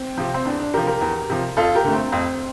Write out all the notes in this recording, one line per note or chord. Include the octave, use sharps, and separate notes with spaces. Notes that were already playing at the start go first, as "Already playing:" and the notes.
Already playing: C4
C3 F3
C4
E2 D4
D4
C3 F3 G4 A#4
G4 A#4
E2
C3 F3
F2 F4 A4
G4 A#4
D3 A3
C4
F2 C4